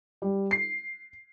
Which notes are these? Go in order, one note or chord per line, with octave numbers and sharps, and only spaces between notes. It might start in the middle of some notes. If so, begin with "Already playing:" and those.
G3
C7